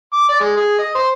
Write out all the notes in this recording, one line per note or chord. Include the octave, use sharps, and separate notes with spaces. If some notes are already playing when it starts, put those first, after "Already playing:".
D6
D5
G#3
G#4
D#5
C5